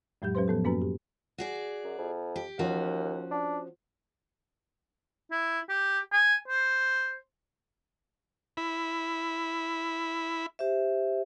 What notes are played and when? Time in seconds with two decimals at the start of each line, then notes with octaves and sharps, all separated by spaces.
0.22 F2 A2 F#3 G#3 G4 G6
0.35 F#3 C#4 G4 B4 C5 C6
0.48 A2 F3 B3 A4
0.64 F#2 A#3 C#4 F#4 B4 A#5
0.82 G4
1.38 F#4 G#4 D5
1.84 F#2
1.98 F2
2.36 G4
2.59 D#2 F3 C#4 F#4
3.31 D4
5.31 E4
5.69 G4
6.12 G#5
6.48 C5
8.57 E4 B5
10.59 G4 C5 E5